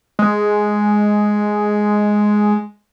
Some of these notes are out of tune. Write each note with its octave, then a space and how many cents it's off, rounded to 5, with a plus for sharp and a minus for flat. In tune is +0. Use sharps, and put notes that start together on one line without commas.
G#3 +5